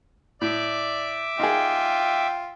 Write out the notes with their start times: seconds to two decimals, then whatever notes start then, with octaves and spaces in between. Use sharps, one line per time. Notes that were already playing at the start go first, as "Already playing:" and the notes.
0.41 A2 D5 E5 D6
1.39 D#4 F4 G#4 G5